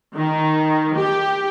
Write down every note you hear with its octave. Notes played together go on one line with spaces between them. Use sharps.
D#3
G4